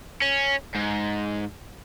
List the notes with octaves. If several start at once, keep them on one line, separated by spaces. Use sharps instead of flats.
C#4
G#2